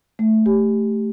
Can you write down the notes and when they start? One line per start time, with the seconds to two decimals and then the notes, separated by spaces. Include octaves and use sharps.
0.19 A3
0.46 G4